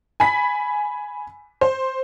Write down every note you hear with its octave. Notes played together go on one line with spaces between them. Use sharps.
G#5 B5 B6
C5